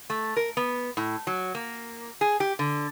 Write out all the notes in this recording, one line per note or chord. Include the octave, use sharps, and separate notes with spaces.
A3
A#4
B3
A2
F#3
A#3
G#4
G4
D3